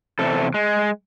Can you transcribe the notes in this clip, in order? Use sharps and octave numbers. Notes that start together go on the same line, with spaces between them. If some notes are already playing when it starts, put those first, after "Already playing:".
E2 C3 A4
G#3